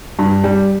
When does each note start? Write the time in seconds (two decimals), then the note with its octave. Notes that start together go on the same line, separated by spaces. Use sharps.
0.19 G2
0.44 G3